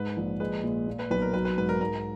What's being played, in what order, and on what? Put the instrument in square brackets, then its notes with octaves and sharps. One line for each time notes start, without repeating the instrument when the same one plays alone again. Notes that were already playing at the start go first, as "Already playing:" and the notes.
Already playing: [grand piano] G#2 [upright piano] B4
[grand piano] A#1
[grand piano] G#3 [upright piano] B4
[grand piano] A#2
A#2
[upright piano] B4
[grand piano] B1 [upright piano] B4
[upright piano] A#4
[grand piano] F#3 [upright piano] B4
[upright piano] B4
[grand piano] G#2 [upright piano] B4
[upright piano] A#4
[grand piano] G#2 [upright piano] A#4